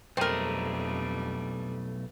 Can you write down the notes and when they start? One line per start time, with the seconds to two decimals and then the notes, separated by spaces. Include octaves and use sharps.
0.17 B1 F2 G3 A3 C4 D4 G#4 A#4